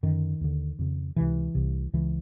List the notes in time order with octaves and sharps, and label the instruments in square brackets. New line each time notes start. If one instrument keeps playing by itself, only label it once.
[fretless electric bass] F#2 D3 D#3
D#2 D3
F2 C#3
C#2 C3 E3
C2 C3
C#2 C#3 E3